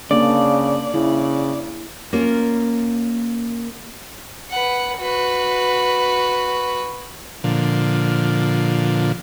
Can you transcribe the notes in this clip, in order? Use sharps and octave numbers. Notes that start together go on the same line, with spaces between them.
C#3 A#3 D4 D5
C#3 E4
A#3 C#4 F4 A#4
B4 F#5
F#4 B4
A#2 D3 F3